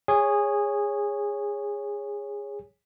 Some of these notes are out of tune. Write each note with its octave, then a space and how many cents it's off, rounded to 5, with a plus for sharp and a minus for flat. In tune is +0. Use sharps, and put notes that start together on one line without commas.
G#4 -20 C#5 +0